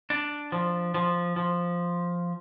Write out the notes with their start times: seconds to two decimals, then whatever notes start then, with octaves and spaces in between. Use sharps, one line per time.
0.10 D4
0.52 F3
0.94 F3
1.36 F3